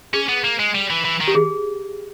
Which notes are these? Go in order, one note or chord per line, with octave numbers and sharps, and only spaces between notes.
C#4 G#4
B3
A#3
G#3
G3
E3
E3
D#3
G4
G#4